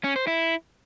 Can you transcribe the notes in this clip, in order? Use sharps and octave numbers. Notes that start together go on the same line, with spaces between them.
C#4
C5
E4